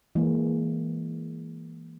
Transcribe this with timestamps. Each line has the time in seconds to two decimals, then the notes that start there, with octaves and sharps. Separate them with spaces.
0.15 E3 G#3 A#3